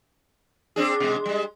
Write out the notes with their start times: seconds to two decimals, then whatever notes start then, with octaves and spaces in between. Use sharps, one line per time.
0.76 C4 D4 G#4
1.00 B2 G#3
1.26 G3 G#3